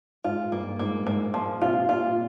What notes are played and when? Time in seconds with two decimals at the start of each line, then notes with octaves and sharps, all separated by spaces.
0.24 G#2 F4
0.52 G2 A#3
0.79 G#2 A#3
1.06 G#2 A#3
1.34 A#2 F3
1.61 C3 F4
1.89 A#2 F4